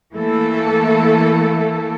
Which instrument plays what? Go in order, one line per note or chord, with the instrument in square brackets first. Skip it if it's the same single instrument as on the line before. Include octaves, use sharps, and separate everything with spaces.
[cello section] E3 A3 A#3 A4